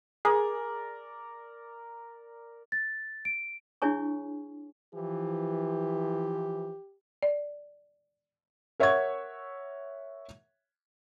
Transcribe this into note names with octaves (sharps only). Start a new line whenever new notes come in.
G#4 A#4 D5
A6
D7
D4 E4 G#4 C#5 G#5 C#6
E3 F3 G4
D5
A#4 C#5 E5 F#5 C#6 G#6